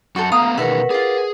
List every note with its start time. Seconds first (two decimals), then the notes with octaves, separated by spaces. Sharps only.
0.16 F#2 F#4 A4 C5 C#6
0.32 A3 B3 F5 A#5 D#6
0.58 B2 D#3 G#4 A#4 B4 E5 F#5 C#6
0.90 F4 G#4 D5